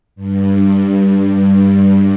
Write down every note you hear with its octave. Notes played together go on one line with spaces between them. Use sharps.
G2
G2